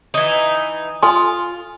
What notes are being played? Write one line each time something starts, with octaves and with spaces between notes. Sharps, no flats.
E3 D#4
F4 A4 G#5 C6